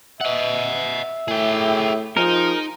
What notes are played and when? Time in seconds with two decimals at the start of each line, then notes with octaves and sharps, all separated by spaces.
0.21 D#5 E5 F#5
1.28 A2 G#4 G5
2.17 F3 D#4 G#4 A#4